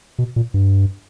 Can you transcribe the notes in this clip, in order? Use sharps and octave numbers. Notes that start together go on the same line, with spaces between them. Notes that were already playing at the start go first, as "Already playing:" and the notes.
B2
A#2
G2